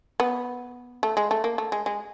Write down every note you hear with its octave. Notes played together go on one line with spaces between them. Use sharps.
B3
A3
G#3
A3
A#3
A3
G#3
G#3